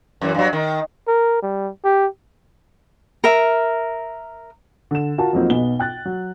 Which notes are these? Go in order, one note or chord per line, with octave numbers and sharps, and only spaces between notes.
F#2 E3
G2 F#3
D#3
A#4
G3
G4
A#4 E5
D3 E7
F4 F#4 A#4 A5
F2 F3 F#3 A#3 C4 D#4
B1 B2 B3 G7
G5 F#6 A6
F#3